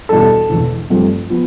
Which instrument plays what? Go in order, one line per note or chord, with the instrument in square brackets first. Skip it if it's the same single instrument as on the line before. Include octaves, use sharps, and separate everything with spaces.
[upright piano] E2 B2 G3 D4 A4
E1 E2 D3
G2 F3 A3 C4
F3 B3